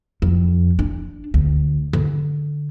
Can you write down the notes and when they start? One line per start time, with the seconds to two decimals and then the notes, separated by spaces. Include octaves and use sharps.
0.22 F2
0.79 D4
1.34 D2
1.93 D3